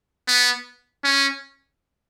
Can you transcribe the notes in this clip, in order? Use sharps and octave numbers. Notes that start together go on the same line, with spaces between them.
B3
C#4